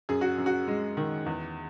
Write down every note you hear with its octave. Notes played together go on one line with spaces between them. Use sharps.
F#2 G#4
F#4
F#2
F#4
G#3
D#3
E2